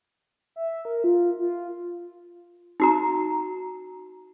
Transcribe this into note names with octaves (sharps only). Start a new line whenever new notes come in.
E5
A#4
F4
F4
D#4 F#4 A#5